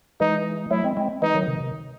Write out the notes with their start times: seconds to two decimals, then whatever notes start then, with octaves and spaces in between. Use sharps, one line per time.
0.20 E3 G#3 D#4
0.71 F#3 A3 E4
0.84 G#3 C4
0.97 G#3 C4
1.22 E3 G#3 D#4
1.35 D#3 F#3
1.47 C3 D#3
1.60 C3